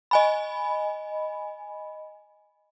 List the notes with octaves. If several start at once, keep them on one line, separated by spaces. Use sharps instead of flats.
D#5 G#5 B5